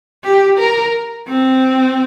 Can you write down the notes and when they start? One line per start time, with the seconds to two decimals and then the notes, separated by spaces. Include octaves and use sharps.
0.24 G4
0.59 A#4
1.28 C4